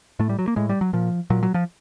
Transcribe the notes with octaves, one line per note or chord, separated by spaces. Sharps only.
A2 A3
G3
F#3
A#3
A2 G#3
G3
F#3
A#2 F3
A#2 F#3
F#3
F3